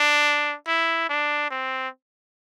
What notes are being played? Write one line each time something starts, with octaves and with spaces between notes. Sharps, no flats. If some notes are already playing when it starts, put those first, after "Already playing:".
Already playing: D4
E4
D4
C4